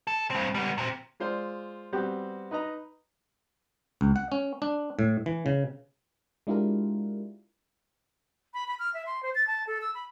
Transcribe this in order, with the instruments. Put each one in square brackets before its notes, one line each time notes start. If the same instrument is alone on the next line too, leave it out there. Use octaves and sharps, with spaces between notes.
[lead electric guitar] A4
G2 C4
G3 B3
A#2 C4
[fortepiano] G#3 F4 C5 D5
G3 B3 C4 F#4 G4
D#4 B4 D#5 A#5
[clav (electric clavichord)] C#2
F#5
C#4
D4
A2
E3
C#3
[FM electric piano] G#3 D4 E4 F4 G4 A#4
[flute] B5
B5
F6
E5
C6
C5
A6
A5
A4
E6
B5